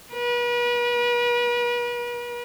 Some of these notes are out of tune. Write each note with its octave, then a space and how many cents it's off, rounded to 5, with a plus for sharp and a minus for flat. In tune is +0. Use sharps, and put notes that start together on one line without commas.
B4 -40